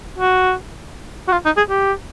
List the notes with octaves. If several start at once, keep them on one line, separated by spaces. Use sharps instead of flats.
F#4
F#4
F4
D#4
G#4
G4